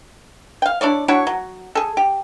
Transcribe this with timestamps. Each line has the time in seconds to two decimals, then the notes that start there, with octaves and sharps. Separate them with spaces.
0.62 F5 G5
0.81 D4 E4 C#5 D5
1.08 D4 E4 F#4 C#5
1.27 F#3
1.75 G#4 A4
1.97 G4